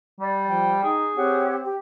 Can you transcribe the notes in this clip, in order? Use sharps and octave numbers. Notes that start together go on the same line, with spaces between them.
G3 D5
F3 G5
D#4 G#4
C4 G4 C#5 F#5
G4